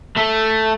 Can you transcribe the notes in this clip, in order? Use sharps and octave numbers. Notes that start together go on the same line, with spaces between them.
A3